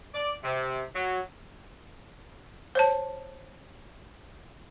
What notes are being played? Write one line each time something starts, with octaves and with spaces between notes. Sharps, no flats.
D5
C3
F#3
C5 C#5 A5